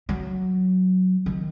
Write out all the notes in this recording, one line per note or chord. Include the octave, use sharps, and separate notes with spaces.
F#3
D#3